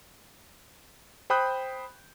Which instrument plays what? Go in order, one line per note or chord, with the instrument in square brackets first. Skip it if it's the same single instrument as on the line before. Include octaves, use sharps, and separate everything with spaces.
[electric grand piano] C5 G5 B5 D#6 F#6 G6